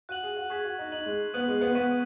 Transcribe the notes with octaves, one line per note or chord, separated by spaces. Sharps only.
F#4 F#6 D#7 F#7
G#4
F#4
G#4 C#6 G#6 B6
F#4
D#4
D#4 G#6 D#7 F#7
G#3
B3 D#6 F#6 D#7 F#7
G#3
B3
B3 C#6 B6 D#7